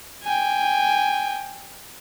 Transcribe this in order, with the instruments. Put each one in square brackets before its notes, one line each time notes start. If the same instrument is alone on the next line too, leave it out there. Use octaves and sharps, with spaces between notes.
[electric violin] G5 G#5